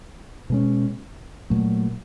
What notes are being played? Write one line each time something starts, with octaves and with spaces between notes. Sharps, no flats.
B2 G#3 C#4
A#2 F#3 A3